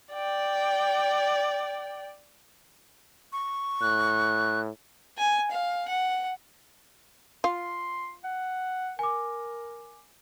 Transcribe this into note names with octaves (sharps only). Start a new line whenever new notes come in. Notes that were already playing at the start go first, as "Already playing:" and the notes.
D5 G5
C#6
A2 F#6
G#5
F5
F#5
F4 C6
F#5
A#4 G#5 D6